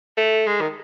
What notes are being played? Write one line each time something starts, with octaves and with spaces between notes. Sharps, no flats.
A3
G#3
D#3